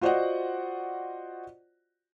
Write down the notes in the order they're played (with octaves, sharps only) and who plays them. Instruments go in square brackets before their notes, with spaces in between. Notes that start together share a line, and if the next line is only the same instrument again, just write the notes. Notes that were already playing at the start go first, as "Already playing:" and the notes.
[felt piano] F4 F#4 C5 D5 D#5 F#5